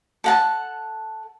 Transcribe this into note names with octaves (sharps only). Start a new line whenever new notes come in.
A4 F#5 A5